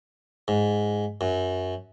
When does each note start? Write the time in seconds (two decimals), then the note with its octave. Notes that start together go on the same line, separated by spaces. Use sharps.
0.48 G#2
1.21 F#2